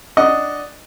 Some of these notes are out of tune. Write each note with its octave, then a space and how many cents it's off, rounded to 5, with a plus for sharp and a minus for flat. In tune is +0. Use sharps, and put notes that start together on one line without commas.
D4 +0 D#5 +0 F#5 +0